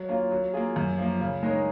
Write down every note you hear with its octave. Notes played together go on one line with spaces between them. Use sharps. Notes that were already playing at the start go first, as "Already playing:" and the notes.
Already playing: F#3
A#3 C#4 F4
F#3
A#3 F4 G#4
F#2
F3 A#3
C#3
G#3 D#4 A#4 C#5